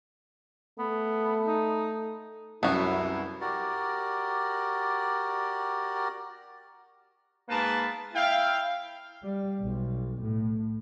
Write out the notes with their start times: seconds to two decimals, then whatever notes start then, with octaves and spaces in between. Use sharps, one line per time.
0.79 A3 B3
1.47 D#4
2.63 C2 F#2 B3 C#4 E4 F#4
3.41 F#4 G4 A#4 D5
7.49 G#2 A#3 B3 A#4 B4 A5
8.14 E4 F5 G5
9.23 G3
9.61 B1
10.22 A2